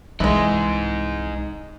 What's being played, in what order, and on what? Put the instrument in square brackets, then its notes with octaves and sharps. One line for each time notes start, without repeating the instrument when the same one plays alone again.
[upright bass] C2 [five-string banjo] E3 G#3 [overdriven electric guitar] D#4 G#4